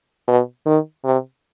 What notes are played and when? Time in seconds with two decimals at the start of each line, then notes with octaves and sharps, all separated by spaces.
0.28 B2
0.66 D#3
1.05 C3